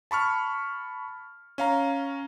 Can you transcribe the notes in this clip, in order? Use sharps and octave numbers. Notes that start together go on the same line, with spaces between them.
A5 B5 C#6 F6
C#4 F5 A#5